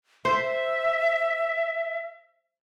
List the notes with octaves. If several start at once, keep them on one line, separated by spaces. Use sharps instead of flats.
C5 E5